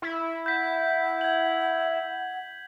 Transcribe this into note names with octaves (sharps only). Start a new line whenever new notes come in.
E4
F#5 G6 B6
G#6 F#7